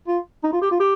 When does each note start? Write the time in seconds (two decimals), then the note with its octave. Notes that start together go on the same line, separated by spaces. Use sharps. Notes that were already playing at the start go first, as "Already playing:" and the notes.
0.07 F4
0.43 D#4
0.53 F4
0.62 G4
0.71 F4
0.80 G4